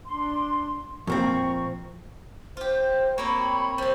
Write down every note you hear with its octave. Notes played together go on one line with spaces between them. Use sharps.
D4 C6
F2 A#2 C4 A#4 C#6
F4 G4 C5
A#3 C4 C#5 B5
C3 G3 C5